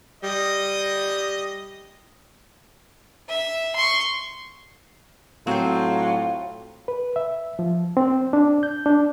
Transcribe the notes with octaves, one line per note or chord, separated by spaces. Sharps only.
G3 D#5
E5
C6 C#6
A2 F#3 C4 F4 C5
B4
E5
F3
C4
D4
G6
D4